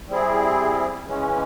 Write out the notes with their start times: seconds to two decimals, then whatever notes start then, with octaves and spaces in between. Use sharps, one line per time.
0.08 G3 C4 E4 G#4
1.06 C#3 E3 G#3 C#4